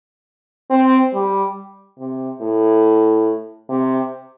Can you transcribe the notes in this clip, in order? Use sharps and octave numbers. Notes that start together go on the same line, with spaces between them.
C4
G3
C3
A2
C3